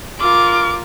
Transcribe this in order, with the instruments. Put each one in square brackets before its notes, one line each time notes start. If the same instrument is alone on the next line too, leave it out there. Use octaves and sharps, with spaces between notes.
[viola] F4 A#4 [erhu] D6